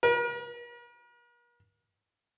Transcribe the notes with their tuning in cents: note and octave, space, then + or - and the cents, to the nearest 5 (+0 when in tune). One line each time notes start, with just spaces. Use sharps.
A#4 +45